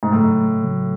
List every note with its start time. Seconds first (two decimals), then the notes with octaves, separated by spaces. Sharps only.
0.03 G#2
0.12 A2 C#3 F#3 A3
0.63 C#3 F#3 A3